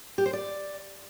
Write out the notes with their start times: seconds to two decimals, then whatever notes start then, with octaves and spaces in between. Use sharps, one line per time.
0.18 G4
0.26 C5
0.33 D5